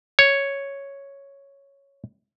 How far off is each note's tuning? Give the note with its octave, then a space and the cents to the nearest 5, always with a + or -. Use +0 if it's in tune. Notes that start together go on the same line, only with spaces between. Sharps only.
C#5 +0